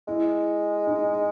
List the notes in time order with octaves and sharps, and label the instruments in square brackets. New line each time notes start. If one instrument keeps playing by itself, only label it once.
[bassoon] G#3 [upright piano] E4
[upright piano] D#4